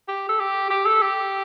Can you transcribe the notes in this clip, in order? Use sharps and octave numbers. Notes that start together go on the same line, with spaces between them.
G4
A4
G4
G4
A4
G4